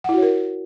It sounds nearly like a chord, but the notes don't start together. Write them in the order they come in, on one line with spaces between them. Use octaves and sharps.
F#5 E4 F#4 C#5 A#4